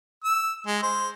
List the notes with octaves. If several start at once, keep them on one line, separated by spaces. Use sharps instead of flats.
E6
G#3
C5